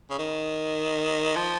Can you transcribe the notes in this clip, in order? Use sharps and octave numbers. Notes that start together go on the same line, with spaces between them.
C#3
D#3
F3